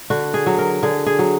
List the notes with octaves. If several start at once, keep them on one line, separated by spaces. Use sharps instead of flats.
D3 F#4
G#4
F#3
A#4
D3 G#4
G#4
F#3